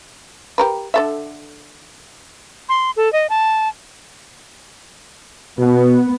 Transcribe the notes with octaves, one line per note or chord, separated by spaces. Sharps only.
G4 A#4 B4
D3 A4 E5
C6
A4
D#5
A5
B2 B3